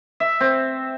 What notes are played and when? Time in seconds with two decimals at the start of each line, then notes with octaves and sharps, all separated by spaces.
0.20 E5
0.40 C4